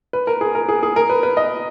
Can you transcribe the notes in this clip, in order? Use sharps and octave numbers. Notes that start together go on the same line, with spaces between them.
B4
A#4
G#4
A#4
G#4
G#4
A#4
B4
B4
D#5